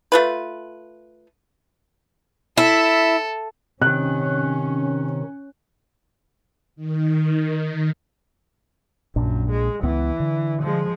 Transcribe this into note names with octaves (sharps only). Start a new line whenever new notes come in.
A3 F4 B4
E4 A4
C3 D#3 C#4 F#6
D#3
A#1 F#2 A#2 D4
G#3
C#2 E3 B3
D3
F3 G#3